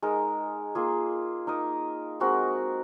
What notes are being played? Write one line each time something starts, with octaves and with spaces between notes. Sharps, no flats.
G#3 D#4 A#4
A#3 F4 G#4
D#4 A#4 D#5
G#3 C4 F#4 A#4